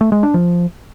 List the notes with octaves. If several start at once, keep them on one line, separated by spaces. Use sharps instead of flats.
A3
G#3
D4
F3